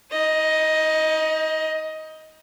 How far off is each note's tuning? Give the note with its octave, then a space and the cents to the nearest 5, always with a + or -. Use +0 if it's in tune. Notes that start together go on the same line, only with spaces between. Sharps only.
D#4 +40 D#5 +10